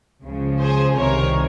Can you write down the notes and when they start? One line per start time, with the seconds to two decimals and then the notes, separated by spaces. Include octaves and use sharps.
0.23 C#2 C#3 F3
0.59 G#4 C5
0.97 C2 C3 D#3 A#4 C#5